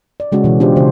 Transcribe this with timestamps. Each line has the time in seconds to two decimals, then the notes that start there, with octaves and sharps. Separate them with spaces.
0.20 D5
0.32 C#3 G#3 C#4 F#4
0.44 B2 E3
0.60 D4 F4 G4 C5 D5
0.76 C#3 C5